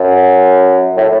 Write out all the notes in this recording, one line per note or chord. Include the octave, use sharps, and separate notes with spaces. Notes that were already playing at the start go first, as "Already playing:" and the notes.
Already playing: F#2
A2